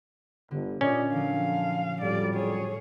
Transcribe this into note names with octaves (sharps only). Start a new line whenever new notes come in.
G1 D3
A#2 C#4 F4 D5 D#5
D3 F3 F#3 F5
F2 A2 F#3 G3 D5 F5
G#4 C#5